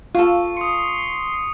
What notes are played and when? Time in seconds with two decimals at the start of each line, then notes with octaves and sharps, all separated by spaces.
0.15 F4 A4 F5 C#6
0.57 C6 D#6 C#7